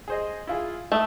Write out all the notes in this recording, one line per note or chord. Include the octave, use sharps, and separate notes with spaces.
G#4 C5 D#5
E4 F4 G#4
A3 E5 D#6 E6